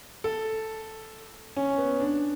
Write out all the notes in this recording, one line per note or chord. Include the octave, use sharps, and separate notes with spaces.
A4
C#4
B3
D4